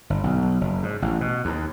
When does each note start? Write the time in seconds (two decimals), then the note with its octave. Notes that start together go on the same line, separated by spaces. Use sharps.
0.10 G1
0.24 B1
0.61 F#1
0.83 G#2
1.02 A1
1.21 B2
1.45 D#2